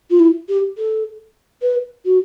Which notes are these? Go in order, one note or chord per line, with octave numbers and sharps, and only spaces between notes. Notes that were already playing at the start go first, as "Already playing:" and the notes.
F4
E4
G4
A4
B4
F#4